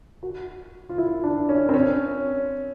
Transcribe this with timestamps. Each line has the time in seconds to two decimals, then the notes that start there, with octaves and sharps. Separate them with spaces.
0.23 F#4
0.89 F4
0.98 E4
1.23 D4
1.49 C#4
1.69 C4
1.74 C#4